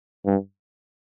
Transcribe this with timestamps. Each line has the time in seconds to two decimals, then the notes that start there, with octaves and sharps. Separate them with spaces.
0.26 G2